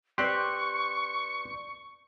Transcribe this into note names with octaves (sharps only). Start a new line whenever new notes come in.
C4 G4 B4 D5 C6 C#6 F#6 G6